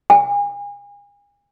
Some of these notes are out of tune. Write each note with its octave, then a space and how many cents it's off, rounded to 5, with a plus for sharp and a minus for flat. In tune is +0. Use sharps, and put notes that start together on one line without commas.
G#5 -35